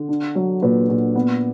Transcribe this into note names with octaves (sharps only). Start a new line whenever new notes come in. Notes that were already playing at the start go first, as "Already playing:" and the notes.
Already playing: D3
D4
F#3
A#2 B4
A#2
B3